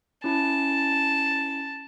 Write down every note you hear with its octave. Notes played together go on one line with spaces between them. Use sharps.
C#4 E4 A5